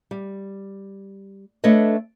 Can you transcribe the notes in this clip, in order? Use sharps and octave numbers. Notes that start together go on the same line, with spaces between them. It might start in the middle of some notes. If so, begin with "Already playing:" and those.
G3
A3 D4 A4 B4 C#5 D#5